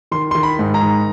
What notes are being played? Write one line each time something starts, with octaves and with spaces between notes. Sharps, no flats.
D#3 C6
D#3 C6
B5
G#2
A#5
D#3